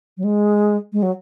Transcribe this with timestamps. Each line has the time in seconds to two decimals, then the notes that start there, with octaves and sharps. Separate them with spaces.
0.17 F#3
0.24 G#3
0.93 G#3
1.03 F#3